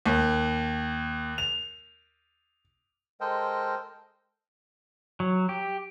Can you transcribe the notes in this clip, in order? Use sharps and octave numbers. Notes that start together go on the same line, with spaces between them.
D#2
F7
G#3 A4 A#4 C5 D#5 G5
F#3
G4